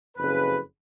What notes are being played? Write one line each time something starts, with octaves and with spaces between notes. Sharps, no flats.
F#1 F2 C#3 B4